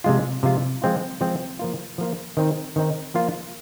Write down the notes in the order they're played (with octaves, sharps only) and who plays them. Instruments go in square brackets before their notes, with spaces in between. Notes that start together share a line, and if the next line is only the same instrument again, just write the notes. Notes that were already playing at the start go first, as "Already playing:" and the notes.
[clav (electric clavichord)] C3 F3 G#3 F4
C3 F3 G#3 F4
F3 G#3 C4 F4
F3 G#3 C4 F4
F3 A#3 F4
F3 A#3 F4
D#3 C4 D#4
D#3 C4 D#4
F3 A#3 F4